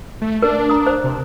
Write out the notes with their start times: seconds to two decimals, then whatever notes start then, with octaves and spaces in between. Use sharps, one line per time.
0.22 A3
0.42 D4 A#4
0.70 A#5 D#6
0.87 C5
1.04 C3